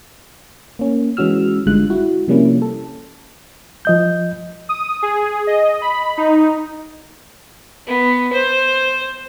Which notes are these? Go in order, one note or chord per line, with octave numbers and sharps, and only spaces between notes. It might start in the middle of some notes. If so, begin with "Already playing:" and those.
A#3 C#4
E3 G#3 C#4 F#4 E6 F6
G#1 D3 G3 G#3 F4 F#6
E4 F#4
C3 F3 G3 A#3 C#4 E4
A4
F3 D#5 G6
D#6
G#4
D#5
B5
D#4
B3
C5